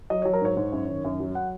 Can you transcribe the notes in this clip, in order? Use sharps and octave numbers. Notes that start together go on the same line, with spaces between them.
F#3 D#5
F#3 C#5
A#4
G#2 C#5
G#2
F#2
D#3
F#2
F#3
F#5